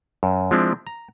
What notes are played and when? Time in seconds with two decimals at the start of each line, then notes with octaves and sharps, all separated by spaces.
0.23 F#2
0.51 F3 G#3 C4 D4 E4
0.87 A#5